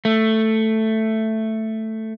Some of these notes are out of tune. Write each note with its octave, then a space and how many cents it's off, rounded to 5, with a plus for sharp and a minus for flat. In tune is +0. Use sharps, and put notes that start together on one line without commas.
A3 +5